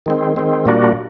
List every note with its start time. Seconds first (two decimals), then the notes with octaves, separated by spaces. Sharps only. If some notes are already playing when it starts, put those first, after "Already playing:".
0.06 D#3 G#3 C4
0.36 D#3 G#3 C4
0.66 A#2 G3 A#3 D4 F#4